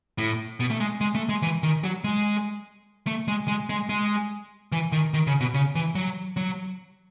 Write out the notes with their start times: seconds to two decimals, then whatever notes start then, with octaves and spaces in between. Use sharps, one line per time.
0.18 A2
0.60 B2
0.71 A3
0.80 G#3
1.01 G#3
1.15 A3
1.29 G#3
1.42 E3
1.63 D#3
1.84 F#3
2.04 G#3
3.07 A3
3.28 G#3
3.48 G#3
3.69 G#3
3.89 G#3
4.72 E3
4.92 D#3
5.14 D#3
5.27 C#3
5.41 B2
5.54 C#3
5.75 E3
5.95 F#3
6.37 F#3